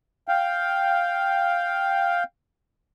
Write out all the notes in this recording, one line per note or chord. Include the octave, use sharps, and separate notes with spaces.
F5 G5